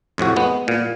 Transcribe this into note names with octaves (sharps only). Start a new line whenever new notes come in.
F2 A2 C3 F#4
G#3 B3
A#2